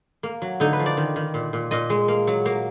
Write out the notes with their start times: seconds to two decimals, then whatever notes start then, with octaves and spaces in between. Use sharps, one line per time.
0.23 A#3
0.42 F#3
0.60 D3 D#4
0.73 B4
0.79 F3
0.86 D5
0.97 D#3
1.16 D#3
1.34 A#2
1.53 A#2
1.71 A#2 D#5
1.90 G#3
2.08 A#3
2.27 F#3
2.46 A#3